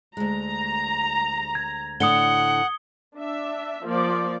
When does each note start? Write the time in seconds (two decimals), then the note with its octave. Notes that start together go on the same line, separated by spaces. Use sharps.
0.17 D2 G#3 A#5
1.55 G#6
2.00 A2 D3 D4 F#5 D#6 C#7 G7
3.18 D4 E5
3.84 F3 A#3 D5